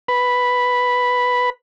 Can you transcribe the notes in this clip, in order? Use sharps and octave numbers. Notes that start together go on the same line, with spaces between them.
B4 B5